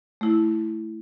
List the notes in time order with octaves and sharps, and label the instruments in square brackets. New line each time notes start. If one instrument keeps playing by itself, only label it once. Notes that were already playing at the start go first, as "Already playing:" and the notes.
[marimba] A3 E4